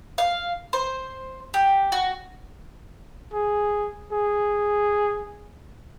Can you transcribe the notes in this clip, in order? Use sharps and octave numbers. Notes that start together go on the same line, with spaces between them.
F5
C5
G4
F#4
G#4
G#4